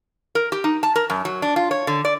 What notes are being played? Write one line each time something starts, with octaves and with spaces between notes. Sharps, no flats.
A#4
G4
D#4
A5
A#4
F#2
F#3
D4
F4
C#5
D3
D5